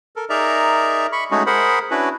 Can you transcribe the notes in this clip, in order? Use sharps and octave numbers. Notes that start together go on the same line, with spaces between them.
A4 A#4
D#4 G#4 A#4 D5 E5 A#5
B5 C#6
G#3 A3 C#4 D#4 F#4 G#4
G#4 A#4 C5 F#5 B5
C#4 D4 E4 F#4 B4